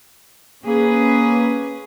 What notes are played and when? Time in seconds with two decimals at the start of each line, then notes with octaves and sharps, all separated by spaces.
0.65 A#3 C#4 G#4 B4